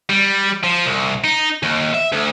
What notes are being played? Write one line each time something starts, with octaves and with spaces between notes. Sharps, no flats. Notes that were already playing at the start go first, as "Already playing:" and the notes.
G3
F3
C2
D#4
D#2
E5
D2